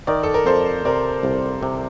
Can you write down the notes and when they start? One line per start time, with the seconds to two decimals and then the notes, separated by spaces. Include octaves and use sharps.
0.07 D#3 A#4 D5
0.23 A4
0.34 A#4
0.46 F2 A4 C5
0.85 C3 A#4 D5
1.23 C2
1.63 C3